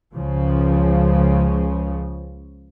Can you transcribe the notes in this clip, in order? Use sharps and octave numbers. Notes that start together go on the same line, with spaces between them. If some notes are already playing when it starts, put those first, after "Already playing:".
C#2 C#3 F3